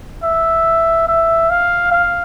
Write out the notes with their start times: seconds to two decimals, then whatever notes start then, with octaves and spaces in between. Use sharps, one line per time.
0.23 E5
1.07 E5
1.50 F5
1.91 F5